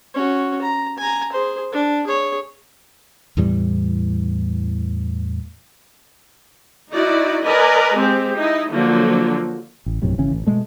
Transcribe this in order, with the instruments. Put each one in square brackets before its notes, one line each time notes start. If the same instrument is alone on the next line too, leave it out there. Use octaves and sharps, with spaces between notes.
[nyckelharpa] C#4 F#4
A#5
G#5 A#5
G#4 C5
D4
G#4 C#5
[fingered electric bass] E2 A2 E3 G3
[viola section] D#4 E4 F#4 D5
A#4 B4 D5 D#5 G#5
G#3 C4 G4
D#4 E4 D#5
D3 F3 F#3 A#3
[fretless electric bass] A1
A#1 F#2 A2 C3
G#1 C#3 E3 C#4
A1
B2 G#3 A3